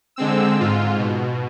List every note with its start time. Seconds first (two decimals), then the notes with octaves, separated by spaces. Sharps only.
0.16 D3 G#3 C4 E6
0.59 G#2 F4
0.97 B2